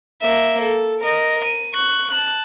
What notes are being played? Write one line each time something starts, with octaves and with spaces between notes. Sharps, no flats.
A#3 E5
A4
A#4 D#5
D#7
C#6 F#6
A5 F#6